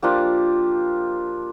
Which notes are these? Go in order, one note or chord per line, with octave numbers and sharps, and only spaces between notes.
F3 A#3 D4 F4 G4